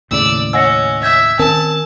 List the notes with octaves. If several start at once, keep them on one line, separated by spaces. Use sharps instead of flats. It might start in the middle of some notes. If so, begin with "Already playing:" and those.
D#2 A2 C#3 D5 E6
C#4 D#5 F#5 G#5 E6 A#6 C#7
E5 E6 G6 G#6
D#3 C4 C#4 A#4 G#5 A5